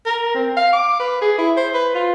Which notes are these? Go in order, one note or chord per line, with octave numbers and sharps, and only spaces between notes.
A#4
C4
F5
D6
B4
G#4
E4
C5
B4
F4